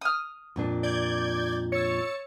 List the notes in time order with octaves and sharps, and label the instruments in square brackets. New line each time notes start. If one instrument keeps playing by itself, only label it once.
[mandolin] D#6 F6
[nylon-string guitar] F2 A#2 D4
[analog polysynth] D5 G6 G#6
[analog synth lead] C#5 [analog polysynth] E6 A6 C#7